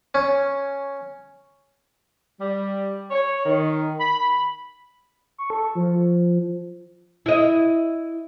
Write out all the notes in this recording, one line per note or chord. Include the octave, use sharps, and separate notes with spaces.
C#4
G3
C#5
D#3
B5
C#6
A4
F3
E4 D#5